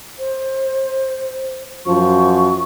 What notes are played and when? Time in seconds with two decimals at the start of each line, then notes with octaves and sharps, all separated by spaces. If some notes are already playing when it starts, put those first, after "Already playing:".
0.19 C5
1.86 F#2 F3 C#6